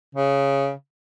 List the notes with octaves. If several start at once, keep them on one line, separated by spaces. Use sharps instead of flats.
C#3